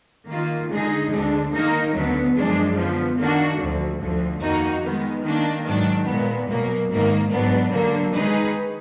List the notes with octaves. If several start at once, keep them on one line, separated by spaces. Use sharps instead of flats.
D#3 A#3 F4
D3 G#3 D#4 G#4
D2 D3 G#3 D4
D#3 A#3 D#4 A#4
D2 D3 F#3 B3
F#2 F3 G#3 D4
D3 F3 B3
D#3 A#3 D4 F#4
D2 D3 F3
D2 D3 F3
F2 D#3 A#3 D#4 F#4
D#3 G#3 B3
D#3 A#3 D4
G#2 D#3 F#3 D4
A#2 G#3 B3
B2 F#3 A#3
G#2 D#3 A#3
G#2 F#3 B3 D4
D3 F#3 A#3
D#3 G#3 D#4 G#4 B4